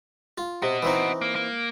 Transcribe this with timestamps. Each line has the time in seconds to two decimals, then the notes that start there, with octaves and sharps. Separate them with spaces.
0.38 F4
0.62 C3 F#4 D#5
0.82 E3 C4 D#4
1.21 A#3
1.35 A#3